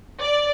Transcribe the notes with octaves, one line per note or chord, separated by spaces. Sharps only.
D5